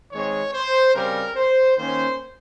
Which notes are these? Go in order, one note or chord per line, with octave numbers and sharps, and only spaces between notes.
D#3 G#3 C4 C#5
C5
C#3 G3 C4 A#4
C5
D#3 A#3 C#4 C5